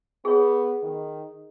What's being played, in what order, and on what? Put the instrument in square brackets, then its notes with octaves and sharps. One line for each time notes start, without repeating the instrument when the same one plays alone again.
[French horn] B3 [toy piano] G#4 C#5
[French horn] D#3